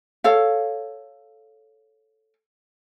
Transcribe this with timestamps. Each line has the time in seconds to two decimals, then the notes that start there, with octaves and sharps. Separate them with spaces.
0.24 A4 C#5 F5